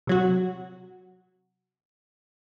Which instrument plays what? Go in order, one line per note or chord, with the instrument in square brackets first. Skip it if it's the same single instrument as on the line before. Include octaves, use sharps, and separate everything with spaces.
[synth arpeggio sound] C3 F#3 F#4